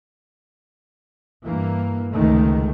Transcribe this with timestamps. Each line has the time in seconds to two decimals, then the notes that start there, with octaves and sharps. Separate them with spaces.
1.45 G2 E3 A#3
2.12 C#2 C3 D#3 G#3 A3